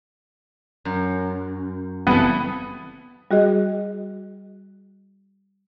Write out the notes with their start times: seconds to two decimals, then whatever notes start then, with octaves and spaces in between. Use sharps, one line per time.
0.85 F#2
2.07 F#1 E3 G3 B3 C4 A4
3.31 G3 F#4 G#4 D#5